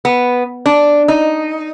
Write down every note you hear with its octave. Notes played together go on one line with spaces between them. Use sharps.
B3
D4
D#4